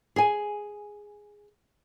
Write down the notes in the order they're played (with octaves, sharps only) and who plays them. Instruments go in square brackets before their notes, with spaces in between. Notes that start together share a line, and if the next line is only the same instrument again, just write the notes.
[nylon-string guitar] G#4 G#5